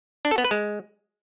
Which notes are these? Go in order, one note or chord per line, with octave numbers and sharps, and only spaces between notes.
D4
A4
B3
B4
G#3